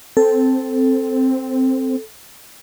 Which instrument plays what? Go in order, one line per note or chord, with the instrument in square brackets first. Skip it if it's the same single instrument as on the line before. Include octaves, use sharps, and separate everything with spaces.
[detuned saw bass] C4 [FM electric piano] A4